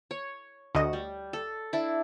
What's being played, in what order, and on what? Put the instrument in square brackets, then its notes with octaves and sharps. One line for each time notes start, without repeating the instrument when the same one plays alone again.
[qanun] C#5
[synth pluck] D2 D#5 [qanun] F#4
[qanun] G3
A4
D4 E4